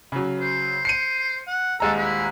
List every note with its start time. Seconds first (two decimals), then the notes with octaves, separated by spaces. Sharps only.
0.12 C#3 F#3
0.40 C5
0.85 C5 C7 C#7 D#7
1.47 F#5
1.80 D#1 G#3 A4 A#5
1.97 E4